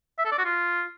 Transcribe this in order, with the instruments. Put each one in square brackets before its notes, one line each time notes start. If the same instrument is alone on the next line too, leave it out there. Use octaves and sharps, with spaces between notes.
[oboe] E5
A4
D5
F#4
F4